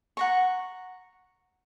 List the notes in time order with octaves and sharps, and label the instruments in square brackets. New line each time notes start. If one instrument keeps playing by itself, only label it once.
[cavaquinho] F#5 A#5 C#6